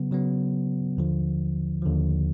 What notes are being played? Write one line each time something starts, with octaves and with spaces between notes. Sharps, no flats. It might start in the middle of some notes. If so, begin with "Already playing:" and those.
Already playing: C#3 F#3 B3
C#3 F#3 B3
D#2 D3 F3
D#2 D3 F3